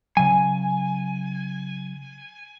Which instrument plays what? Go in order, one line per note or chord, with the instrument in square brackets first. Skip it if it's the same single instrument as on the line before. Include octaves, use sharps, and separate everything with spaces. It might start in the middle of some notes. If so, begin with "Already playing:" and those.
[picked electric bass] C#3 F#3 [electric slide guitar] G#5